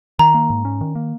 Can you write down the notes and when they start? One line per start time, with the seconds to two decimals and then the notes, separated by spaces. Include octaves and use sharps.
0.19 D#3 A#5
0.34 A#3
0.50 G#2
0.65 C#4
0.81 D#3
0.95 A#3